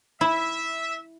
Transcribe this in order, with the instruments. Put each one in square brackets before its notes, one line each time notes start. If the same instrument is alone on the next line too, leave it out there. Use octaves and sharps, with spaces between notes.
[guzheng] E4 [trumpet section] E5